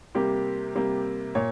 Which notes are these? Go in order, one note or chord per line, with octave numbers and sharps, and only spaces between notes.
C3 G3 A#3 G4
C3 G3 A#3
A#2 C#5